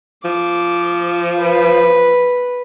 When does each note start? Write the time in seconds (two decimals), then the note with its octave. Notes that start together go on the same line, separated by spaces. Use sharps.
0.25 F3 D6
1.40 B4